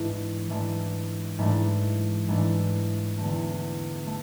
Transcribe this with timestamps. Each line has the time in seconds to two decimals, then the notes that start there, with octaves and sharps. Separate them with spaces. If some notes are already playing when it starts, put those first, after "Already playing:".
Already playing: G#2 E3 A3 D4
0.50 G#2 E3 A3 D4
1.39 G#2 E3 A3 D4
2.28 G#2 E3 A3 D4
3.18 E2 D3 A3
4.07 A3